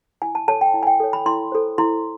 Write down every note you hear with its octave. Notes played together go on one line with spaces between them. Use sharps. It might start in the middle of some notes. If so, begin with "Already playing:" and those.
E4 G#5
A5
A4 C#5 A5
G5
E4
G#5
G5
A4 C#5
B5
E4 C6
A4 C5
E4 C6